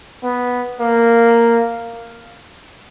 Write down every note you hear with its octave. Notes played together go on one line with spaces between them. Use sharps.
B3
A#3